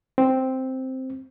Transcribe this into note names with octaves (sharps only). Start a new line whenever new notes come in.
C4